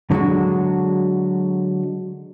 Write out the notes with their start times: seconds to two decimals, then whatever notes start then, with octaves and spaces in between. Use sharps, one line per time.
0.10 D3 F#3 G#3 D4 F#4